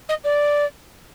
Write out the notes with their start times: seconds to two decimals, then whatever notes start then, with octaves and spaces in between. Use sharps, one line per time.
0.09 D#5
0.24 D5